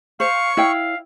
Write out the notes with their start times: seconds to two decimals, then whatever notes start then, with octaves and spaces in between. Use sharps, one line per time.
0.20 C5 F5 C#6
0.57 E4 C#5 F5 G5